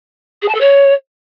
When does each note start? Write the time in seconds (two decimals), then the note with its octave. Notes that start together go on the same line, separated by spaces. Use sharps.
0.42 G#4
0.48 A5
0.54 A4
0.60 C#5